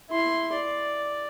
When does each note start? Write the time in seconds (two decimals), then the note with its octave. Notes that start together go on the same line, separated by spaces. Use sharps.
0.11 E4 C6
0.53 D5